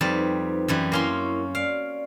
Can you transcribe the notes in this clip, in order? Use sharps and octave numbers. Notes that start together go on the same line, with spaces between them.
F2 G3 D#4 B4 C5 A5
F#2 E3 G3
A#3 C#4 E4 A#4 C6
D5 F5